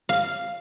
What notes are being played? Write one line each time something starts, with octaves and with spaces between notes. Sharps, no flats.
F5